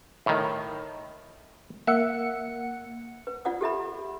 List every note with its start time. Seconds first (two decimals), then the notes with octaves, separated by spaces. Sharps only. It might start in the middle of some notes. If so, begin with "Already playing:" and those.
0.26 A2 D#3
1.87 A#3 E5 F#5 C#7
3.27 B4
3.45 F4 D5 F#5 D#6
3.61 G4 A4 E5 B5